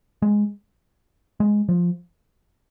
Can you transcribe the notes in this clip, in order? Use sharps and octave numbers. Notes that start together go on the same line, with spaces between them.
G#3
G#3
F3